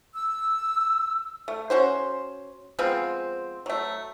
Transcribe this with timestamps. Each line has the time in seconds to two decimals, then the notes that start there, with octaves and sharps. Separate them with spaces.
0.14 E6
1.48 A3
1.70 C#4 F#4 C5
2.79 F3 G#3 B3 C4
3.66 F#3 A3